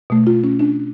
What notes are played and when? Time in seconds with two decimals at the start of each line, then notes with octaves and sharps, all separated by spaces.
0.10 B2 A3
0.27 F4
0.44 C#4
0.59 D4